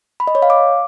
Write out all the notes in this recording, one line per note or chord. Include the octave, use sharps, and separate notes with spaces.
B5
D#5
C#5
F5
D6